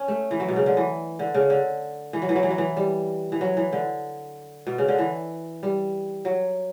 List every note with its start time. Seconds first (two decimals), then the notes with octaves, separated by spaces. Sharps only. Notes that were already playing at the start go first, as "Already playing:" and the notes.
Already playing: C#4
0.08 A3
0.31 E3
0.40 F#3
0.48 B2
0.56 C#3
0.66 D3
0.77 E3
1.19 D3
1.34 C#3
1.50 D3
2.13 E3
2.22 F#3
2.29 E3
2.36 F#3
2.43 E3
2.50 F#3
2.58 E3
2.77 G3
3.32 E3
3.41 F#3
3.57 E3
3.73 D3
4.67 B2
4.78 C#3
4.88 D3
4.98 E3
5.63 G3
6.25 F#3